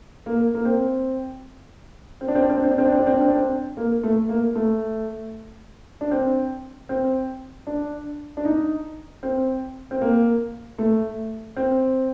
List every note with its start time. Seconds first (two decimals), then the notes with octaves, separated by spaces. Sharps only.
0.26 A#3
0.55 A#3
0.65 C4
2.21 C4
2.28 D4
2.35 C4
2.43 D4
2.50 C4
2.57 D4
2.64 C4
2.71 D4
2.78 C4
2.85 D4
2.92 C4
3.00 D4
3.07 C4
3.14 D4
3.21 C4
3.28 D4
3.35 C4
3.77 A#3
4.03 A3
4.29 A#3
4.55 A3
6.01 D4
6.11 C4
6.89 C4
7.67 D4
8.37 D4
8.45 D#4
9.23 C4
9.91 C4
10.01 A#3
10.78 A3
11.57 C4